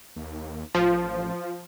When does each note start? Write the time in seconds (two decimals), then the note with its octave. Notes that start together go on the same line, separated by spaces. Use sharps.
0.16 D#2
0.75 A1 F3